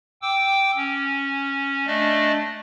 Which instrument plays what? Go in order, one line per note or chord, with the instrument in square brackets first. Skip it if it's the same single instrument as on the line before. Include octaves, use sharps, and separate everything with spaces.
[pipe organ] G5 D6 E6
C#4
A3 D4 D5 D#5